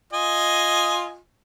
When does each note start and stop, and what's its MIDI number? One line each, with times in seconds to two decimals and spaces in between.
0.13 1.17 65
0.13 1.17 75
0.13 1.17 80